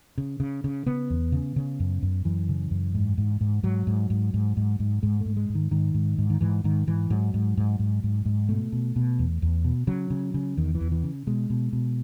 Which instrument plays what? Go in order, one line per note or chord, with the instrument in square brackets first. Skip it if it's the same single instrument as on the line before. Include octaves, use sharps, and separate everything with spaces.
[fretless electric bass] C#3
C#3
C#3
C#3 B3
E2
C#3
C#3
F#2
F#2
F#2 E3
C#3
F#2
G#2
G#2
G#2
G#2 F#3
G#2
G#2
G#2
G#2
G#2
G#2 G#3
A3
G#2
G#3
G#2
D#3
G#2 D#3
G#2
G#2
D#3
G#2 E3
G#2 D#3
G#2 E3
G#2 F#3
G#2
G#2
G#2
G#2
G#2
B2 A3
B2
B2
E2
E2
B2
C#3 F#3
C#3
C#3
E2 D#3
E3
E2
E3
C#3
B2 G#3
B2
B2